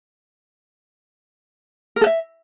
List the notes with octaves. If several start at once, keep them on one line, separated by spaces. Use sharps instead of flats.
A#4
A4
E5